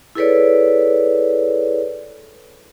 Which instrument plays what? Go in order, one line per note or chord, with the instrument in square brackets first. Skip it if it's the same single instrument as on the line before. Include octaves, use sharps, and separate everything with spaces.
[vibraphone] E4 G#4 A4 B4 C#5 D5